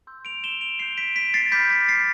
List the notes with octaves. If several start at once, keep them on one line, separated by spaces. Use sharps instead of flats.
C6 E6 G6
D7 F7
E7 G7
D7 F7
C6 G6 C7 E7
B6 D7
B6 D7
A6 C7
B5 D6 F6 G6 B6
A6
A6 C7